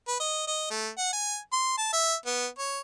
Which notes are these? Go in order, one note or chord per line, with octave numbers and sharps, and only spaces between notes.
B4
D#5
D#5
A3
F#5
G#5
C6
A5
E5
B3
C#5